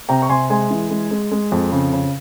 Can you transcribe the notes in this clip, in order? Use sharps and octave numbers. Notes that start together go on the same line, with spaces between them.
C3 G5 A#5
C#6
C3 G#5 C6
G#3 G#5 C6
E3
G#3
G#3
G#3
F2
C#3
C#3